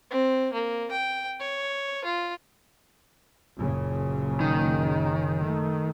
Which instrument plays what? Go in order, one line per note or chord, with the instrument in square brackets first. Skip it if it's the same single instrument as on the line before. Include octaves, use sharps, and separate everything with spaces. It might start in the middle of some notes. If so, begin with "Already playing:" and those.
[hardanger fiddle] C4
A#3
G5
C#5
F4
[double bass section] F#1 A#2 C#3
[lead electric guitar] D#3
[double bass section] A3